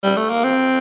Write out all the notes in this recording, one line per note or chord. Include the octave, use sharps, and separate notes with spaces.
G3
A3
A#3
C4